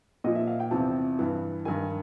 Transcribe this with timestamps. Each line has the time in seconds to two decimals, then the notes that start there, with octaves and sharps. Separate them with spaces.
0.24 A#2 F3 D#5
0.35 E5
0.47 F5
0.60 G5
0.71 E2 C3 F3 A5
1.19 G2 E3
1.65 G2 D#3 G#5